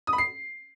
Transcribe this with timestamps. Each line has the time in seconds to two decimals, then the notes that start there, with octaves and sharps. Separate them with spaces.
0.07 D#6
0.13 B5
0.18 C7